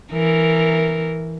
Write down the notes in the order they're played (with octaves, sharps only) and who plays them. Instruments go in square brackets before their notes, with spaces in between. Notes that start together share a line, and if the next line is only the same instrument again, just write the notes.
[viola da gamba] E3 A#4